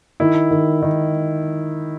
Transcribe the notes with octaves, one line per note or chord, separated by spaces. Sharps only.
D#3 E4
D#3
D#3